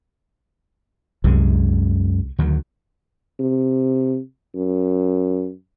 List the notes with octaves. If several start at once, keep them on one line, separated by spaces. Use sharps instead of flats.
C2 F#2 G#3
D2 D#3 F#3
C3
F#2